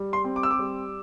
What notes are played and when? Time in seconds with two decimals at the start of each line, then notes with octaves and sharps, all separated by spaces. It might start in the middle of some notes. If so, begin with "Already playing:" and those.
Already playing: G3
0.13 C6
0.24 C4
0.36 D6
0.43 E6
0.50 D6
0.59 G3